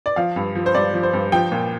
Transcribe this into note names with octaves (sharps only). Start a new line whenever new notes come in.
D5
F3 F5
G2
F3
C5
G2 D5
F3
C5
G2
F3 G5
A#2